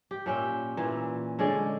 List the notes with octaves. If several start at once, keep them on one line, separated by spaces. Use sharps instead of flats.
G4
A#2 C#4 E5 G5
A#2 E3
D3 G#3 C#4 D5